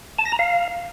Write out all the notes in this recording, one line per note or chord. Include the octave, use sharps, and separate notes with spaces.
A5
A#6
A#5
F5